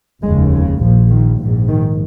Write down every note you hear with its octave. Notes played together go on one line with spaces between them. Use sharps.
F1 D#2 C#3 G#3
G#3
A#1 A#2 F3
D#3
A#1 G#2
D#3